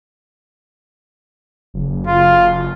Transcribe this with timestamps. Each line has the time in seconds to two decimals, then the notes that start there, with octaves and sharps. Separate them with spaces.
1.74 F#1
2.07 F4